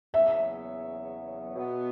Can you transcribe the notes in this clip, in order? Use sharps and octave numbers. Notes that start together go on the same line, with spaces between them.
E2 C#3 F#3 B3 E5
B2 F#3 B3